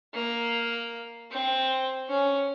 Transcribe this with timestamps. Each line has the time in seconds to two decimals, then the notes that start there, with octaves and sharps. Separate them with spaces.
0.14 A#3
1.31 C4
2.09 C#4